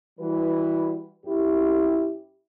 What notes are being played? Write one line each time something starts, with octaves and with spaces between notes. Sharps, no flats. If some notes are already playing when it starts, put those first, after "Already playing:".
E3 G3 F#4 B4
F#2 C#4 E4 G4